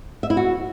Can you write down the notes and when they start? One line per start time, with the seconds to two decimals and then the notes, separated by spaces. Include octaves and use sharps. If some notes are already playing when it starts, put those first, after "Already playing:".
0.23 E5
0.30 E4
0.37 F#4